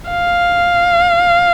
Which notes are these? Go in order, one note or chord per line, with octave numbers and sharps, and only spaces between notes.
F5